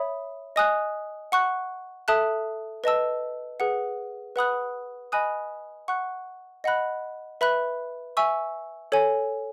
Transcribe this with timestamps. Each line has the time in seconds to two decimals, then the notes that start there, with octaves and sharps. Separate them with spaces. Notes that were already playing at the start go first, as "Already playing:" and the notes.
Already playing: C#5 E5 B5 D#6
0.56 D#5 G#5 D#6 F#6
1.32 F#5 C#6 F#6
2.08 A4 E5 A5 D#6 F#6
2.84 B4 D#5 A5 E6
3.60 G#4 B4 F#5
4.36 B4 F#5 B5 D#6 F#6
5.12 D#5 G#5 B5 D#6 F#6
5.88 F#5 C#6 F#6
6.64 D#5 F#5 B5 F#6
7.41 B4 E5 B5 F#6
8.17 E5 G#5 C#6 E6
8.92 A4 C#5 G#5